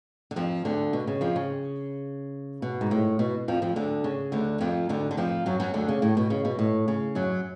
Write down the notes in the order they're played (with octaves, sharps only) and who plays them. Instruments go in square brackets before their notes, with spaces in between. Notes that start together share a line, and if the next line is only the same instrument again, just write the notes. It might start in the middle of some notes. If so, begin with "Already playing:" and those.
[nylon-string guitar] D3
F2 F3
D2 D3
B2
C#3
F2 F3
C#3
B2
G#2
A2
B2
F2 F3
F2 F3
D2 D3
C#3
D2 D3
F2 F3
D2 D3
D3
F2 F3
F#2 F#3
F#2 F#3
D2 D3
C#3
A2
B2
C#3
B2
A2
C#3
F#2 F#3